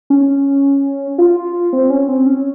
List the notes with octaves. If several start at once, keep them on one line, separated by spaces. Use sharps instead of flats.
C#4
F4
C4
C#4
C4
C#4